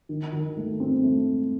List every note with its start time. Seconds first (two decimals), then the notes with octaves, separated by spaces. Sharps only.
0.09 D#3
0.33 D#3
0.57 A3
0.80 C4
1.03 A3